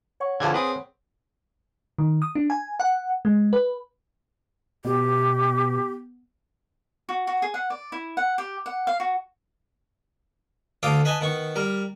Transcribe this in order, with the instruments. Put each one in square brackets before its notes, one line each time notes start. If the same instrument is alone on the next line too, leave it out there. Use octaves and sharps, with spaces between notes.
[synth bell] C#5 F#5 C#6
[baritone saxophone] E2 [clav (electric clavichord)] D3 F3 [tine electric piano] E4 G5 G#6
[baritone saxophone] C4 [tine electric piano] G#4 D#6 [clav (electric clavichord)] B4
[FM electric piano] D#3
D#6
D4
G#5
F#5
G#3
B4
[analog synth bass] B2 [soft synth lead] B3 [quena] G4
[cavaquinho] F#4
F#4
G#4
F#5
D5
E4
F#5
G4
F#5
F5
F#4
[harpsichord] D2 A4 F5 G5 D6 D#6
B4 D#5 G#5 A5
D#3 B3 C#6
G3 A#4